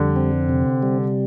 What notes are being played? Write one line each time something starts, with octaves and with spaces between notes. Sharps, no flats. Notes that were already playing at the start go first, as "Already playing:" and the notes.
Already playing: F2 D3 G3
C4
C3
G3